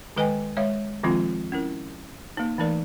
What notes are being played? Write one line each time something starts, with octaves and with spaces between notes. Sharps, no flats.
D#3 G#3 B4 D#5 G5 G#5
G#3 C#5 E5 F5
D#3 F3 G#3 C4 F4
C#4 E4 A#4
A#3 D#4
E3 A3 D#4 A#4 D5